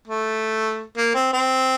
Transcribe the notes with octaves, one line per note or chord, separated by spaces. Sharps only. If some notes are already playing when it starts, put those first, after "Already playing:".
A3
A#3
C4
C4